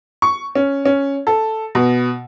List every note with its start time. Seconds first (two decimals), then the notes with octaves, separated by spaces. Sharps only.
0.22 C#6
0.55 C#4
0.85 C#4
1.27 A4
1.75 B2